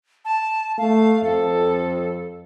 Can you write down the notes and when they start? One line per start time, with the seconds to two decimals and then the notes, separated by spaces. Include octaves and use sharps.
0.25 A5
0.78 A3 F5
1.23 F2 A4